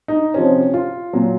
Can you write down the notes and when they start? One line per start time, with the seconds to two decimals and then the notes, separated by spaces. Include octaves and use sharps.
0.08 D#4
0.34 C3 F3 C#4
0.74 F4
1.13 A#2 F#3